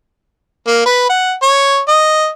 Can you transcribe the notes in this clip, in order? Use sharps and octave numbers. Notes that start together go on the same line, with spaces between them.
A#3
B4
F#5
C#5
D#5